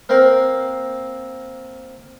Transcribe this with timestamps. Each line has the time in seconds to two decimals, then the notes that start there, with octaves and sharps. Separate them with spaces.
0.09 A#3 C4 A#4